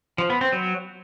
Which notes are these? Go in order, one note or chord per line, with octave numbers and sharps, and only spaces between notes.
F3
B3
C4
F#3